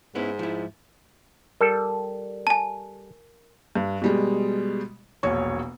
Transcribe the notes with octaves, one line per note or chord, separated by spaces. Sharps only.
G#2 B3 C#4 E4
F3 E4
G3 A4 A#4
G#5 A5
G2
B2 G3 G#3
E1 A#1 C#5 C#6